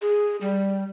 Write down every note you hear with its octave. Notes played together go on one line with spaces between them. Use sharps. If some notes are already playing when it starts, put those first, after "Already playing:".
G#4
G3